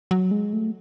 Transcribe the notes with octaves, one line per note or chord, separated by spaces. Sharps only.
F#3
G#3
A3